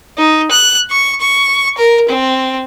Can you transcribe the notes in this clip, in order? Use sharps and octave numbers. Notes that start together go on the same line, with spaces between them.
D#4
F#6
C#6
C#6
A#4
C4